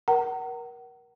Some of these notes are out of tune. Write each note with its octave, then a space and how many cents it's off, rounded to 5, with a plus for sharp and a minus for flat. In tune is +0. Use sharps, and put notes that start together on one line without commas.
A#4 +25 F#5 +40 A#5 -30